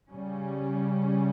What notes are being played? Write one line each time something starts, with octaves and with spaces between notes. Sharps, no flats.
C#3 G3 C#4